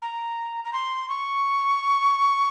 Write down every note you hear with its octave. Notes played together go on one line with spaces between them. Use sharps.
A#5
A#5
C6
C#6